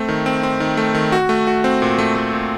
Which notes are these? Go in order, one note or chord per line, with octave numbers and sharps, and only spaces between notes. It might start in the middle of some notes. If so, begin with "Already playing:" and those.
Already playing: A3 C4
D#3
C4
C4
D#3
A3
D#3
F#4
A3
F#4
C4
A#2
A3
A3
A#2